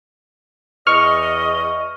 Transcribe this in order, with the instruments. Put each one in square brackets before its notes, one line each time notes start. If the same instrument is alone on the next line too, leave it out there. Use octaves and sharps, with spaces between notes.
[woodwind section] E2 D#5 [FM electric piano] C#6 F6